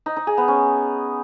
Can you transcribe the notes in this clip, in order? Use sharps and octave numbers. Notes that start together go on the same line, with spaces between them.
D#4
D#4
G#4
B3
C#4